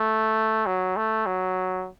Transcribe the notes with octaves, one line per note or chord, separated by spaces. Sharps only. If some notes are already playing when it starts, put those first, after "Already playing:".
Already playing: A3
F#3
A3
F#3